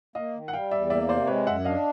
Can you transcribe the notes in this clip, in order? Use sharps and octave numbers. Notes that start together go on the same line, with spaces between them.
A#3 D#5 F5
D#3
F#5
G3 F5 G5
E2 D5 E5
A#3 D5 E5
C3 C5 D5
G#3 B4 C#5
F#2 E5 F#5
D4 D#5 F5